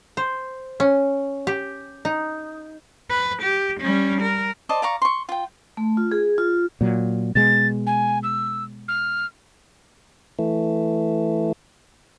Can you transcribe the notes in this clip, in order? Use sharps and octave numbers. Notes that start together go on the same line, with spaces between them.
C5
C#4
G4
D#4
B4
G4
G3 C#4
A#4
C5 D5 D#5 A5
D5 F5 A#5 C#6
C6 C#6
F4 G5
A3
F4
G#4
F4
A#2 F#3
B2 G#3 A6
G#5
E6
F6
E3 A3